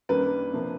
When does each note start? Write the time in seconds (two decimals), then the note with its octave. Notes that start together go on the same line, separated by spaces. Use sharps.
0.09 F#2 D#3 G3 A#3 D4 B4
0.53 C3 F3 A#3 D4